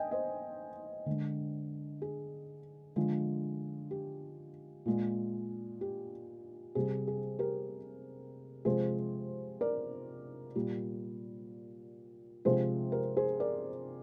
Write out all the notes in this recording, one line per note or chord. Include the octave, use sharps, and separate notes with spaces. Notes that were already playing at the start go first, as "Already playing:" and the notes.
Already playing: D#5 G5 G#5
C5 D#5
D3 G#3
G#4
D3 F3 G#3
G4
A#2 G#3
G4
C3 G3 G#4
G#4
G4 A#4
C3 F3 G#3 G#4 C5
A#4 D5
A#2 G3
C3 F3 G#3 G#4 C5
G4 A#4
G#4 C5
A#4 D5